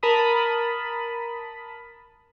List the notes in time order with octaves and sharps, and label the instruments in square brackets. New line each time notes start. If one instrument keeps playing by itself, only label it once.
[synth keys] A#4 A5 B5 D#6